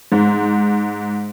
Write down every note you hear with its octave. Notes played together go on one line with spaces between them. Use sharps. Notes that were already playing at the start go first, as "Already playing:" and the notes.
G#2